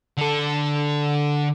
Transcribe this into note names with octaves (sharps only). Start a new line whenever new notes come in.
D3 A4